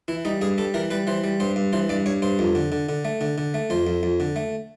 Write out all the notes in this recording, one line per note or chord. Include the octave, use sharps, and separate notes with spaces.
E3 E4
G3 D#4
G2 G#4
G3 A4
E3 A#4
G3 B4
E3 C5
G3
G2 C5
G2
E3 C5
G2 D5
G2 C#5
G2 C5
F2
D3
D3
D3
A3
D3
D3
A3
F2 C5
F2
F2
D3
A3